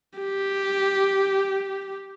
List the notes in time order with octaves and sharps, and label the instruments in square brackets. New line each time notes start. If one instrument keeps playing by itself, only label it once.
[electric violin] G4